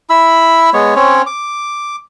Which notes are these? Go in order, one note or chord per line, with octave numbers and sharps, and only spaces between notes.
E4 B5 E6
G#3 B3 C#5
C4 C#4 C#5
D6